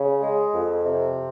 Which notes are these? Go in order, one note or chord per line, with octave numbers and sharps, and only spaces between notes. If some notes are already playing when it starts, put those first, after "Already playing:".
Already playing: C#3
G#3
F2
C3